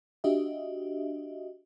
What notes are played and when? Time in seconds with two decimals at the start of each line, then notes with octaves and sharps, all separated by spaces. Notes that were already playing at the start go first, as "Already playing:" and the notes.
0.24 D4 F#4 G4 D#5 E5